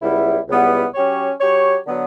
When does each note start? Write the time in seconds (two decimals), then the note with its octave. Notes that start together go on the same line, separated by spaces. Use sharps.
0.02 C#2 C#3 G3 B3 E4
0.48 C#2 C#3 G3 B3 E4
0.94 F#3 C#4 G4 C#5
1.41 F#3 C#4 G4 C#5
1.87 D3 F#3 B3